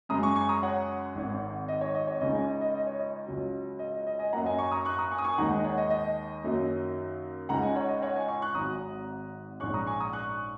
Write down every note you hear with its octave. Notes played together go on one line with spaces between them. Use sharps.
F#2 C#3 G#3 A#5 D#6
G#5 C#6
G#5 C#6
A#5 D#6
C#5 F#5
G#1 G#2 D#3
D#5
C#5
D#5
C#5
C#2 C#3 G#3 D#4 D#5
D#5 G#5
D#5
D#5
D#5
C#5
D#5
C#2 C#3 F#3
D#5
D#5
D#5
D#5 G#5
F#2 F#3 A#3 F#5 A#5
D#5 G#5
G#5 C#6
A#5 D#6
C#6 F#6
A#5 D#6
G#5 C#6
D#6
G#5 C#6
D#2 D#3 G#3 D#4 F#5 A#5
D#5
C#5 F#5
D#5
D#5
F#2 D#3 F#3 A#3 D#4
C#2 C#3 G#3 D#4 F#5 A#5
D#5 G#5
C#5 F#5
D#5
C#5 F#5
D#5 G#5
G#5 C#6
C#6 F#6
G#1 G#2 F#3 A#5 D#6
A#1 G#2 G#3 C#4 C#6 F#6
A#5 D#6
G#5 C#6
A#5 D#6
C#6 F#6